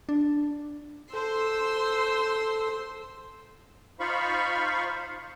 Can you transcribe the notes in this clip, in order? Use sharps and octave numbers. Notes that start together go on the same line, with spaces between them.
D4
A4 C5 C6 E6
D#4 F4 C5 F5 B5 C#6